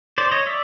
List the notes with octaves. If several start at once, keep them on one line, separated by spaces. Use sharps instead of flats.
C5 D5
C#5 D#5
D5 E5